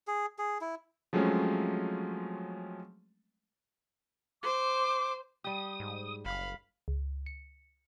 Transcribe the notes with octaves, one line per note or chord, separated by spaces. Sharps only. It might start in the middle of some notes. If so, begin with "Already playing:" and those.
G#4
G#4
E4
F3 F#3 G#3 A3 C4 C#4
C5 D6
G3 G4 D#6
G#2
F#1 F5 B5
C#2
C#7